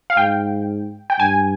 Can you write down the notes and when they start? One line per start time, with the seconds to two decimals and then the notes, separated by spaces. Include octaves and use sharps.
0.10 F5
0.17 G#2 G5
1.10 G5
1.20 G2 G#5